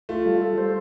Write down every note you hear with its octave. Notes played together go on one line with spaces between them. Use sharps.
A3 F4
G3
A4
C5